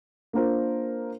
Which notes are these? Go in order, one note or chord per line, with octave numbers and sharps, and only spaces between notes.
A#3 D4 F4 A#4 C5